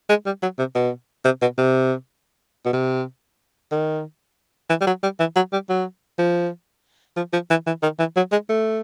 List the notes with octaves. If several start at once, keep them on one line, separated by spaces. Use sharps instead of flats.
G#3
G3
F#3
C3
B2
C3
B2
C3
B2
C3
D#3
E3
G3
F#3
G3
E3
F#3
G3
F#3
F3
F3
F3
E3
E3
D#3
E3
F#3
G#3
A3